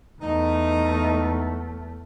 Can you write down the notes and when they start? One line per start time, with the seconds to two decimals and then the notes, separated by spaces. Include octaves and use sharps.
0.21 E2 A3 D#4